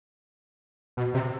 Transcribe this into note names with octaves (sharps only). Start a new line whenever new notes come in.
B2
C3